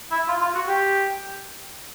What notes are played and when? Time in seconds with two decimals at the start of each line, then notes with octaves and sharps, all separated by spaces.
0.11 E4
0.28 F4
0.42 F4
0.55 F#4
0.68 G4